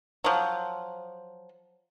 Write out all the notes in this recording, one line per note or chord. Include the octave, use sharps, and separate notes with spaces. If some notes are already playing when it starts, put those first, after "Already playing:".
F3 F#3